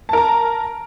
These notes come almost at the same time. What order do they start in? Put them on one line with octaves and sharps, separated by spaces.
A5 A#4 A#5